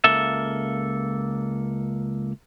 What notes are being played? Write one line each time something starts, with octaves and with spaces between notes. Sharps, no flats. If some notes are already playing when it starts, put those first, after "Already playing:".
C#2 A#3 A4 E5